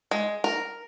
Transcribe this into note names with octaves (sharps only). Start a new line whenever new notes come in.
G#3
A#4